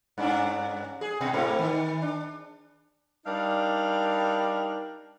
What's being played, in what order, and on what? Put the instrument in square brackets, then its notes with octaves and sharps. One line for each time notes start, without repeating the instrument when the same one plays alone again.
[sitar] G2 C#4 D4
G#4
B2
G#2 A3 C4
D#3
D4
[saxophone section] G3 D4 D#4 A#4 D5 F5